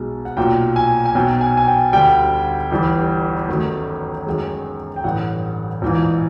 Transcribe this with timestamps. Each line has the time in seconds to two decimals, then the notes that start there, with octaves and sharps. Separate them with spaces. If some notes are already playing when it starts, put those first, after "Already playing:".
Already playing: B1 B2 G#3
0.25 F#5
0.37 B1 A#2 F#3 G5
0.76 G#5
1.06 G#5
1.15 B1 B2 F#3 G5
1.41 G#5
1.57 G#5
1.67 G5
1.93 D2 D3 G3 G5
2.71 G1 G2 E3 G3
3.48 F#2 D#3 F#3 A3
4.26 F#2 D#3 G#3
4.96 G5
5.04 A1 G2 D3 F#5
5.82 A#1 G#2 E3